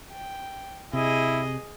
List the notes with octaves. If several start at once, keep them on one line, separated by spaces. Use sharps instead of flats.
G5
C3 E4 G#4 D#5